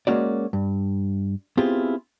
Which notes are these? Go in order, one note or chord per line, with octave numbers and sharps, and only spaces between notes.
G#3 A#3 C#4 F#4 D5
G2
B3 C4 E4 F4 G4 G#4